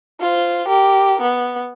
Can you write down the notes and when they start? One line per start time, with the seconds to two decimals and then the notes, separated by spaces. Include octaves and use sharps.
0.21 F4 C5
0.68 G4 A#4
1.21 B3